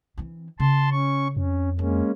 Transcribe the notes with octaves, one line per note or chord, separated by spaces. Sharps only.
E3 C4
C#3 A5 C6
C#4 C#6
F2 C#4
G#3 A#3 C4 C#4